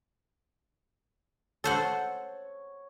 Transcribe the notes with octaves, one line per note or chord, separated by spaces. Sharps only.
A4 C5 C#5 F#5